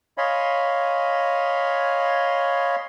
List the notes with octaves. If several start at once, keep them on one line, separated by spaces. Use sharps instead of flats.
C#5 D#5 F5 G#5 B5 C6